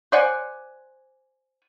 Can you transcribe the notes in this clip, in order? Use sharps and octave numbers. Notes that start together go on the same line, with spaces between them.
C5 D5 F#5 G#5